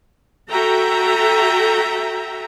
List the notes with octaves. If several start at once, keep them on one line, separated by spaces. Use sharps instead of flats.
F#4 A4 E5 G5 A#5